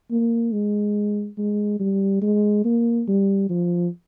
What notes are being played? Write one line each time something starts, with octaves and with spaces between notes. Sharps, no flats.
A#3
G#3
G#3
G3
G#3
A#3
G3
F3